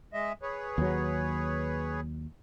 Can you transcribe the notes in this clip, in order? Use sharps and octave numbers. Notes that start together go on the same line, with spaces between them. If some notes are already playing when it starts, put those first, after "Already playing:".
G#3 D#5 E5
G#4 B4 C#5
D#2 F#3